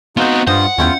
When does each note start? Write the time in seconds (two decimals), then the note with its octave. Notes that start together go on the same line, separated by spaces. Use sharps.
0.17 B3 C4 D#4 F4 F#4 C5
0.47 G2 F4 C5 D#5 F#5
0.78 E2 C#4 E4 F4 G5